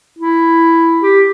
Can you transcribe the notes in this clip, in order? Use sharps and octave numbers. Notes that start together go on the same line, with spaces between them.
E4
G4